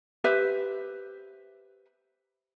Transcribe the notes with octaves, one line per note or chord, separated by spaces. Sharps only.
G4 B4 C5 E5